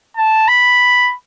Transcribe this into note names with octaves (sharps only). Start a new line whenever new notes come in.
A5
B5